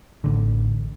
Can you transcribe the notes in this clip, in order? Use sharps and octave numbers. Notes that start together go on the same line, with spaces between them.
A1 D3